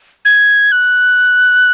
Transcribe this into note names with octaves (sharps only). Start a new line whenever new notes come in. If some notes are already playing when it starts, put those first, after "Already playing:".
G#6
F#6